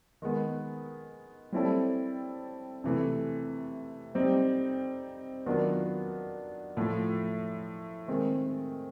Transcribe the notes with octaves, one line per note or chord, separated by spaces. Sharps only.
D#3 G#3 B3
G3 C4 E4 A4 C#5
C3 E3 A3
G3 C4 D#4 G4 C5
D#3 F#3 B3 D4 F4
A2 F3 A3
D#3 G#3 C4